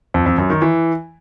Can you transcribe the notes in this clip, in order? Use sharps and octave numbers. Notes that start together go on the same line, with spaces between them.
F2
F2
F#2
D#3
E3